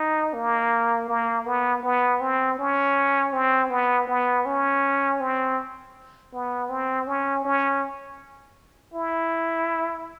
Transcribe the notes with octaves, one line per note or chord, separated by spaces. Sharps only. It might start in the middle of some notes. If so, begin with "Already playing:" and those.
Already playing: D#4
A#3
A#3
B3
B3
C4
C#4
C4
B3
B3
C#4
C4
B3
C4
C#4
C#4
E4